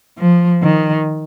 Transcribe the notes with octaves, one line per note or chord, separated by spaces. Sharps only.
F3
D#3